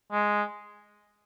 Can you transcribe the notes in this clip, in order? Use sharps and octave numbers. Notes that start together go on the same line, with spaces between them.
G#3